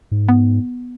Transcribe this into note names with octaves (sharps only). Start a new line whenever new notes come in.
G#2
B3